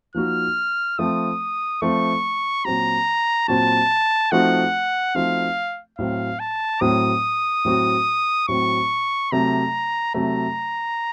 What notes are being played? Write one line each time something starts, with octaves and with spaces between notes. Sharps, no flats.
F3 A#3 D#4 F#4 F6
F3 A3 C4 D#6
F3 A3 C4 C#6
A#2 F#3 C4 F#4 A#5
A#2 F#3 C4 F#4 A5
F3 A3 C4 D#4 F#4 F#5
F3 A3 C4 D#4 F#4 F5
A2 F#3 C4 F5
A5
A2 F#3 C4 D#6
A2 F#3 C4 F#4
A2 F#3 C4 F#4 C#6
C3 F#3 A3 A#5
C3 F#3 A3 A#5